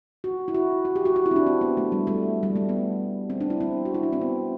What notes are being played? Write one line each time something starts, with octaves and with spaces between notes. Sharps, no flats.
F#4
E4
F#4
F#4
G4
F#4
F#4
E4
C4
D4
C4
B3
A3
G3
A3
G3
A3
B3
C4
D4
E4
C4
F#4
E4
D4
C4
B3